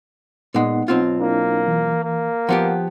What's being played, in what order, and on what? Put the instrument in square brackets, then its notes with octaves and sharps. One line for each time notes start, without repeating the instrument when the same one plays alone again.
[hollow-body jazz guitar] A#2 G#3 [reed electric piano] B3 D#4 F#5
[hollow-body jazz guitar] B1 C4 F4
[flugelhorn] A#3 [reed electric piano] D4 E4
[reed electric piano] E3
[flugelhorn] A#3
[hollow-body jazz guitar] F3 B3 G4 [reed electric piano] F#5